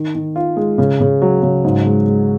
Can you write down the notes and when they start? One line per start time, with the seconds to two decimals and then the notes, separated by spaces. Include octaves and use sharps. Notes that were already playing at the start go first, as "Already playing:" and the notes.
Already playing: D#3
0.15 D#3
0.36 F4
0.57 G#3
0.78 C#3
1.00 C#3
1.22 F#3
1.42 C#3
1.64 G#2
1.86 G#3
2.07 G#3